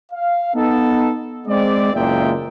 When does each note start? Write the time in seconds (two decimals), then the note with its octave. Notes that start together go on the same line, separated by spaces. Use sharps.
0.12 F5
0.54 B3 D#4 A4
1.47 G#3 C4 D5
1.93 F#1 E2 A#2 G#3 E5 G5